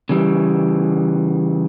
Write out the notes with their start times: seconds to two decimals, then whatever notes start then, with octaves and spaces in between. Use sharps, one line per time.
0.09 C#3 E3 G3